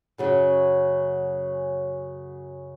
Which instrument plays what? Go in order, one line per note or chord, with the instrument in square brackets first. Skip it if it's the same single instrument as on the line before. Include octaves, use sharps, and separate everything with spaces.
[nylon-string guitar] F#2 C#3 F#3 C#4